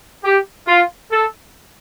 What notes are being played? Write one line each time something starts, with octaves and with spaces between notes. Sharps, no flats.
G4
F4
A4